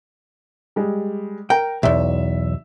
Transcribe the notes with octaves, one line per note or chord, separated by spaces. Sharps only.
G3 G#3
A#4 G5
B1 E2 E5